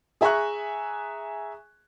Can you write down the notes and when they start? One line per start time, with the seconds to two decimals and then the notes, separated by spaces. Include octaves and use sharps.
0.21 G#4 E5 G#5 A#5 C#6 F#6